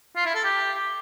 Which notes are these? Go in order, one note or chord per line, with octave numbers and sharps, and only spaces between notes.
F4
E4
A4
G4